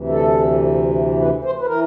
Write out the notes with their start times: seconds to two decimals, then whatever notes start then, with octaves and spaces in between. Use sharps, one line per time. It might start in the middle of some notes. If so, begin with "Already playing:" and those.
Already playing: D2 C3 E3
0.09 A4
1.22 B4
1.44 C5
1.60 B4
1.67 E3 A#4